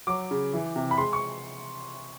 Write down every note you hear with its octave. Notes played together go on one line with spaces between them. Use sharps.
F#3 D6
C#3
E3
C3
B5
G#3 C6
C#6